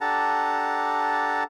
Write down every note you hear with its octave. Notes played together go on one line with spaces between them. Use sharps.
D4 G4 A4 F#5 A5 A#5